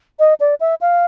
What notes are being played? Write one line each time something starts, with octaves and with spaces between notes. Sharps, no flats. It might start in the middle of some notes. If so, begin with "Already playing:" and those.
D#5
D5
E5
F5